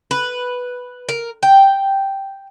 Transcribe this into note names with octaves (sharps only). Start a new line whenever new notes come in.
B4
A#4
G5